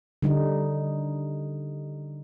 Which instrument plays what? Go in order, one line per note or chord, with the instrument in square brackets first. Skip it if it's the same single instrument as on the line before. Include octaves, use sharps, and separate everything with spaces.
[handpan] D3 G3 D#4